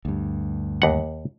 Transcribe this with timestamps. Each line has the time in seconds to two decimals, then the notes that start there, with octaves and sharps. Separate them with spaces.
0.05 D2 G2
0.82 D#2 F#5